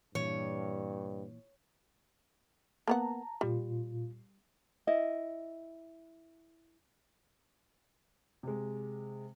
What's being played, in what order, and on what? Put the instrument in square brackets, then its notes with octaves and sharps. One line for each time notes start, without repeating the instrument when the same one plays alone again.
[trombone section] G2 [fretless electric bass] A#2 E3 [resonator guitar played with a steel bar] C#5
[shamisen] A#3 B3 F#5 [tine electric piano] A5 A#5
[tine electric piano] A#2 F4 [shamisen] G3
[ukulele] E4 D#5
[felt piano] C3 G#3